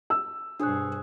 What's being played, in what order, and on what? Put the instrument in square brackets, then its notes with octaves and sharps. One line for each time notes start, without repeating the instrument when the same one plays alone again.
[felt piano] E6
[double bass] G2 B2 [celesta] D4 F#6 [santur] G#4 C5 C#5